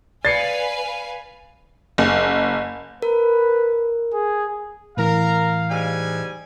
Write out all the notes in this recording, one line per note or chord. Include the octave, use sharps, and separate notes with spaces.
B4 D5 F5 G#5 A6 C7 C#7
F#1
A#4 B4
G#4
A2 E3 A#4 F5
G#2 G3 G#5